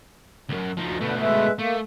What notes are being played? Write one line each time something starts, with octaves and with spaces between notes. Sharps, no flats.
C#2 F#2
D2 F3 D#4
B2 D3 A3 B4
G#3 B4 E5
A3 A#3